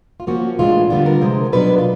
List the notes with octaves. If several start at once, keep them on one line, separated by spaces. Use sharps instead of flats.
F4
F3 A#3 C#4 F#4
A2 E3 G#3 B3 D4 F4
D3 G3 B3 D4 F4
A#4
C3 F3 G#3
B2 F#3 B3 D4 B4
F4